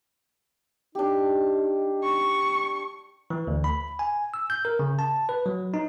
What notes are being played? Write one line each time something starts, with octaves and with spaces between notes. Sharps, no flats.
D4 D#4 G4
C#6
E3
D2
B5
G#5
E6
G6
A#4
C#3
A5
B4
F#3
D#4